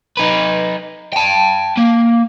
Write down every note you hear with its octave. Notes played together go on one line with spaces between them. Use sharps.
D#4 B4
G5 A5
A#3